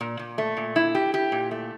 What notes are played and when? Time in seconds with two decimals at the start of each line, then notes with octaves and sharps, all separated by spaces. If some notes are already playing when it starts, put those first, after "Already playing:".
0.01 A#2
0.19 A#2
0.38 A3
0.57 A#2
0.76 E4
0.95 G4
1.14 G4
1.32 A#2
1.51 A3